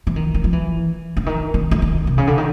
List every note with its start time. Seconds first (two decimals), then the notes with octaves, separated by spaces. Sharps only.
0.07 E3
0.16 D#3
0.34 E3
0.44 F3
0.53 E3
1.17 D3
1.26 D#3
1.54 D#3
1.71 D3
1.82 D#3
2.07 C3
2.18 C#3
2.27 D3
2.38 D#3